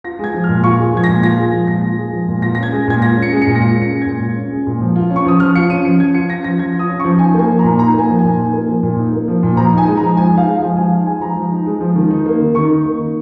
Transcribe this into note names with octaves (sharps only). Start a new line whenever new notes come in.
F4 A#6
G#3 G#6
F3
F6
A#2
F4 C#6
G#3
F3 G#6
A#6
A#2
F4 A#6
G#3
F3
A#2 A#6
F4
G#3
F3
A#2
F4 A#6
A#6
C#4
G#6
G#3
A#2 G#6
F4 A#6
C#4
C#7
G#3
C#7
A#2
A#6
F4 C#7
C#4
C#7
G#3
A#2 G#6
F4
C#4
G#3
A#2
F3
F4
C#4
C#6
F3 D#6
F3 F6
F4 C#7
C#4 D#7
F3 C#7
F3 G#6
F4 C#7
C#4 A#6
F3 A#6
F3 G#6
F4
D#6
C#4
C#6
F3
D#4 G#5
A#3 G#5
F3
A#5
A#2
D#4 A#5
A#3 G#5
F3
A#2 G#5
D#4
A#3
F3
A#2
D#4
A#3
F3
A#2
F3 A#5
D#4 G#5
G#3
A#5
F3
F3 G#5
D#4
F5
G#3
F5
F3
F3 G#5
D#4 F5
G#3 G#5
F3 A#5
F3
D#4
G#3
F3
D#3
D#4
A#3
D#3
D#3 C#6
D#4
A#3
D#3